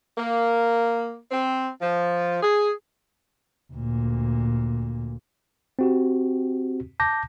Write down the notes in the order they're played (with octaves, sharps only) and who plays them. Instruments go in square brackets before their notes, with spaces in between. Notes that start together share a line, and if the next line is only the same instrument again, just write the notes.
[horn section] A#3
C4
F3
G#4
[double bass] D2 A#2
[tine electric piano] C4 F#4 G4
A5 D6 G6 A#6